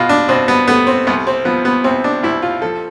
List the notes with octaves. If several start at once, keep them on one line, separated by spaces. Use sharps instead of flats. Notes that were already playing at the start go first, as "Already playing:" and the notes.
Already playing: B2 F4
D4
B2 C4
B3
A3 B3
C4
C2 B3
C4
F3 B3
B3
C2 C4
D4
C2 E4
F4
F3 A4